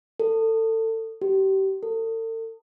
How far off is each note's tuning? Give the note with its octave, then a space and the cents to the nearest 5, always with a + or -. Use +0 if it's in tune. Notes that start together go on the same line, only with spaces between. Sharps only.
A4 +25
G4 -30
A4 +40